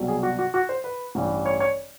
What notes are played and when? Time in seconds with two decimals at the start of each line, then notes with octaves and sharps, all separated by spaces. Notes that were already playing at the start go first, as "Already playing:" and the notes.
Already playing: C2 B2 F#3
0.08 G#4
0.23 F#4
0.39 F#4
0.54 F#4
0.69 C5
0.84 B4
1.15 A1 G2 E3
1.46 C#5
1.60 C#5